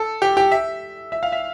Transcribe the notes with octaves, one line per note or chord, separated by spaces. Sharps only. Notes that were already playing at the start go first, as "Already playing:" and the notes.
Already playing: A4
G4
G4
E5
E5
F5
E5